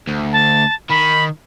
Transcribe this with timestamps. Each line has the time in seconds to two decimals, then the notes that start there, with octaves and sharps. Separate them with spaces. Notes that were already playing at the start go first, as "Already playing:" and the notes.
0.07 D2
0.32 A5
0.90 D#3 B5